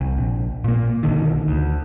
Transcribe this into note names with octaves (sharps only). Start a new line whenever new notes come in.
C2
A#1
A#2 A#3
B1 D3 D#3
D2